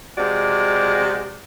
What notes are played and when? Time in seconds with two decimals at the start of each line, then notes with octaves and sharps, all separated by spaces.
0.17 C3 G#3 F#4 D5